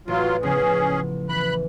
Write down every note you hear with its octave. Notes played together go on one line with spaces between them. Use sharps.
A1 F#3 F4
C#3 F3 B3 C#4 G#4
E3 B5 F#6